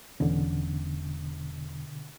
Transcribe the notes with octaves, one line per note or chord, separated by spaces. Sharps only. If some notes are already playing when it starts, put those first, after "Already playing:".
E1 B2 D3 E3 C#4